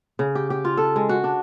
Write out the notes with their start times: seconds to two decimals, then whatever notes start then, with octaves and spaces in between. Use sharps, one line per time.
0.19 C#3
0.35 G4
0.50 G4
0.65 F4
0.77 A4
0.96 G#3
1.09 F#4
1.24 D4